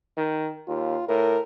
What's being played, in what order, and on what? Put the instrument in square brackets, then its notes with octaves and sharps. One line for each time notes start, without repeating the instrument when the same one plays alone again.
[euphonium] D#3
[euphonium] D#2 [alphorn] F4
[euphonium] A2 [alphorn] A#4